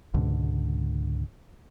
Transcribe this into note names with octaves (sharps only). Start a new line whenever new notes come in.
C#2 G#2 B2 D3